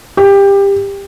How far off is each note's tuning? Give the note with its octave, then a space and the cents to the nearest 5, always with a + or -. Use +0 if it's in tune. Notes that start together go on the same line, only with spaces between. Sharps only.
G4 +20